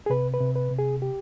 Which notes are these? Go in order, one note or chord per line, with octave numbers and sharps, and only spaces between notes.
G#4
C3 B4
B4
C3
B4
C3
G#4
G4